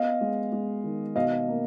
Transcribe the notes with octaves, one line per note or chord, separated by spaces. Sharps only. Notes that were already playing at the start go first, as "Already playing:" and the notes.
Already playing: B3 D#5 F5
G#3
G#3
D#3
B2 D#5 F5
A#3